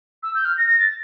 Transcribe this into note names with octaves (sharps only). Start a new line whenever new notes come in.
E6
G6
F6
A#6
A#6
A6